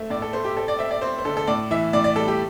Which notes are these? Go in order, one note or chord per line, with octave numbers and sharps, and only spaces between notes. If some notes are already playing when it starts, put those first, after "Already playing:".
Already playing: A3 C4 E5
A2 D5
A4
A3 C5
G4
C4 A4
D5
C4 E5
D5
C4 C5
C5
D3 A4
A4
A2 D5
E3 E5
A2 D5
D5
G3 A4
G4